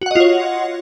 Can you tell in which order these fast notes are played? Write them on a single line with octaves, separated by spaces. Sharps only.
F#4 F#5 D#5 F4 C#5